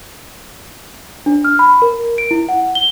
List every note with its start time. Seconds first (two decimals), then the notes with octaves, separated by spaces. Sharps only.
1.26 D4
1.45 F6
1.59 B5
1.82 A#4
2.18 D7
2.31 E4
2.49 F#5
2.75 G7